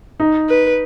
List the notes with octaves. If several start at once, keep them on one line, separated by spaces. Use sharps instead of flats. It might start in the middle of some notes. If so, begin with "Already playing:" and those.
D#4
B4